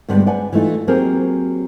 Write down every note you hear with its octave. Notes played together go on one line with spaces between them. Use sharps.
D2 G2 G3 G#3 B3 D4
B4 D5 F#5 G#5
E3 G3 A3 D#4 F4
F#3 A#3 C4 G4 G#4 A#4